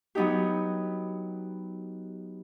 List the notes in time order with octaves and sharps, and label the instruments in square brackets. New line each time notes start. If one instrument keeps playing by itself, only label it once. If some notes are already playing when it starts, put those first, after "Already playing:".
[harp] F#3 B3 D#4 G4